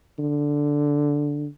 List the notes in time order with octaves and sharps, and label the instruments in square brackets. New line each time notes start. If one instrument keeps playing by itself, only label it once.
[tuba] D3